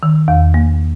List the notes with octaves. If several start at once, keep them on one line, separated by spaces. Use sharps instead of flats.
D#3
E2
A#3